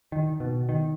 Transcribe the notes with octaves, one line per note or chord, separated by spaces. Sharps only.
D#3
B2
D#3